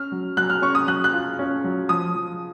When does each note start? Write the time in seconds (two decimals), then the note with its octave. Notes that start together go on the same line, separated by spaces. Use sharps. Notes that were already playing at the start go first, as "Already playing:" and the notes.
Already playing: C#4 F6
0.12 F#3
0.37 F#3 F#6
0.50 F6
0.62 C#4 C#6
0.75 D#6
0.87 F#3 F#6
1.04 F#6
1.13 F4
1.39 C#4
1.64 F#3
1.89 F3 D#6
2.15 F3